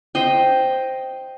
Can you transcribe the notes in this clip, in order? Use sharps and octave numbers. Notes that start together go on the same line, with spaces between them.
C5 D#5 G5